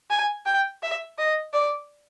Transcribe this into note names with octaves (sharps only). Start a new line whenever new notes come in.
G#5
G5
E5
D#5
D5